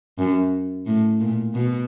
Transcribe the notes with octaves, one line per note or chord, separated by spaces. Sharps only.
F#2
A2
A#2
B2